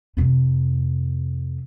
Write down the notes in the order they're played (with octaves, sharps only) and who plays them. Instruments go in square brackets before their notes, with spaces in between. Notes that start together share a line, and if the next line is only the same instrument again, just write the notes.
[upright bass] F2 C3